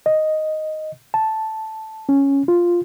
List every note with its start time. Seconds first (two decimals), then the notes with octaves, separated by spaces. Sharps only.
0.06 D#5
1.14 A5
2.09 C#4
2.48 F4